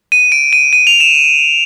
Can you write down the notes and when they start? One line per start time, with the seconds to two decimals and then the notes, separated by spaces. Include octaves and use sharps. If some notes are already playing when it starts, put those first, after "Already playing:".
0.12 D#7
0.32 D7
0.53 D#7
0.73 D#7
0.87 F7
1.00 E7